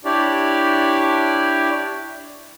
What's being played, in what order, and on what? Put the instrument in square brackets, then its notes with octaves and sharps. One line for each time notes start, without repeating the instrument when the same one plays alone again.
[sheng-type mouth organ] D4 E4 G4 C#5 D5